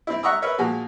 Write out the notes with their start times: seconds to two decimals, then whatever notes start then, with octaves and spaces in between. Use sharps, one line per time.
0.07 C4 E4
0.23 E5 F#5 A#5 C#6 D#6 E6
0.42 A#4 B4 C#5 E5
0.58 A#2 F3 G#3 F#4